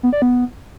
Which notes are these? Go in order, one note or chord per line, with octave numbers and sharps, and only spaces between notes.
B3
D5
B3